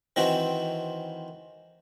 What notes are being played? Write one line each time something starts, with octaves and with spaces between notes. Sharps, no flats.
D#3 E3 C4 F#4